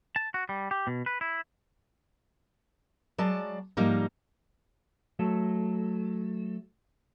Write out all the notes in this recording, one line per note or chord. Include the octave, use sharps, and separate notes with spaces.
A5
F#4
G3
G4
B2
B4
E4
F#3 G#3 D5 A5
G#2 F3 G3 A#3 D#4
F#3 A3 A4